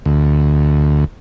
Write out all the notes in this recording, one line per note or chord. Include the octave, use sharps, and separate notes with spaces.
D2